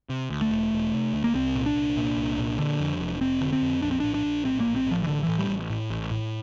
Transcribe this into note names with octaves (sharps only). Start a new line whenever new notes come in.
C3
D2
A3
E1
E1
C3
D2
A#3
C2 C4
A#2
D4
C2
A#2
C2
A#2
D3
F2
F1
F1 C4
D3
C4
F2
A#1 D4
C4
A2 D4
D4
A#1
A2 C4
A#3
A#1
C4
A2 F3
E3
A1 D3
E3
A2
G3
A1
A2
A1
A2